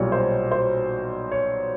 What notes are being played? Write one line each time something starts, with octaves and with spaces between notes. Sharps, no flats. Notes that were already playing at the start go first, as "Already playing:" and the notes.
Already playing: B1 A#2 G3 C#5
C5
C5
C#5